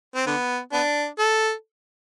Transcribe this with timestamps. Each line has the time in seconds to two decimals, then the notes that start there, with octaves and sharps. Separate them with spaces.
0.15 C4
0.26 D3 B3
0.73 B3 D4
1.19 A4